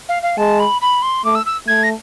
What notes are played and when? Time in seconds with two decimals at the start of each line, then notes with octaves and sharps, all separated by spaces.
0.09 F5
0.23 F5
0.38 G#3 A5
0.60 B5
0.82 B5
1.02 C6
1.25 A3 D6
1.35 E6
1.46 E6
1.67 A3 G#6
1.83 A#6